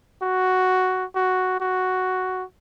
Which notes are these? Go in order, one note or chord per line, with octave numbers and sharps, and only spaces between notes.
F#4
F#4
F#4